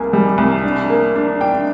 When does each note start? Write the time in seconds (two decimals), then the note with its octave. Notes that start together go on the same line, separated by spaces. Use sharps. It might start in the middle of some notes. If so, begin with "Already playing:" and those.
Already playing: C2 A#3 G#5
0.13 G3
0.38 C2
0.63 D4
0.90 A#3
1.15 D4
1.41 D4 G5